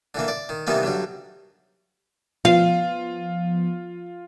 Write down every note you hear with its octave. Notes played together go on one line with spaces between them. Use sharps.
D3 E3 A#3
D5
D#3
C3 D#3 E3 G3 A#3 B3
G2 D3 F#3 G3
F3 B3 F4 F5